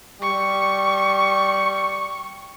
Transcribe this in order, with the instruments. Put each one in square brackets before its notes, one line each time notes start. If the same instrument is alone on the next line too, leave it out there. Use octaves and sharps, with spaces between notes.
[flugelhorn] G3 [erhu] C#6